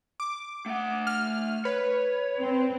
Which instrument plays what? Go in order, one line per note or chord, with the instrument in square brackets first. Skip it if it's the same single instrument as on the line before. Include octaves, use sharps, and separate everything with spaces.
[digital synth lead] D6
[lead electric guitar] A3 F#5
[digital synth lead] F6
[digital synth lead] B4 [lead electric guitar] C#5
[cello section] C4